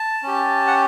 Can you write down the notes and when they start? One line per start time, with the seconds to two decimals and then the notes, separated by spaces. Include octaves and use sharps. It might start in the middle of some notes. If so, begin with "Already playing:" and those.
Already playing: A5
0.23 C#4 G4
0.67 F#5